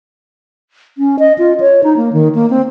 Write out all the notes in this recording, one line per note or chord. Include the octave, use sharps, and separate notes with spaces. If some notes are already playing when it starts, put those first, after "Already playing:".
C#4
D#5
F4
C#5
D#4
A#3
D#3
A#3
C4